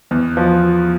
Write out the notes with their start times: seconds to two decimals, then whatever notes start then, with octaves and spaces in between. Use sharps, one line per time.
0.11 E2
0.37 F3